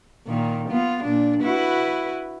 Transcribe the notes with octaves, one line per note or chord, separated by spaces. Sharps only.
A#2 D#3
B3 F4
A#2 D4
E4 F#4 B4